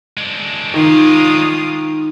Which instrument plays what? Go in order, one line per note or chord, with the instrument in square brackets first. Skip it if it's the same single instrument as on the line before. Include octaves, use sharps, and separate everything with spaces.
[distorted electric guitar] G#3 D4
[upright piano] D#3 [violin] F4 D#6